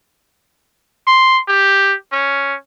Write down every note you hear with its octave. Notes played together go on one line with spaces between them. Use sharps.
C6
G4
C#4